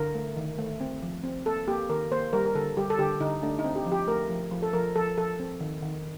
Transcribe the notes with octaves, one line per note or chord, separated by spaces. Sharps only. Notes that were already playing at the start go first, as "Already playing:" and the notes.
Already playing: D3 A#4
A3
D#3
A3
C4
F3
C4
A#3 A4
A#3 G4
D#3 A#4
A#3 C5
G3 A#4
A#4
D3 A4
G3 G4
A4
D3 G4
D3 D#4
A3 D4
D#4
C4
G4
F3
G4
A3 A#4
F3
F3
A4
F3 A#4
F3 A4
F3 A4
C4
D#3
D#3